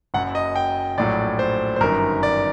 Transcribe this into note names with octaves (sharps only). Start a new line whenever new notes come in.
F#1 F#2 F#3 F#5
D#5
G5
A#1 A2 F#3 D5
C5
C5
G1 F#2 D#3 A#4
D5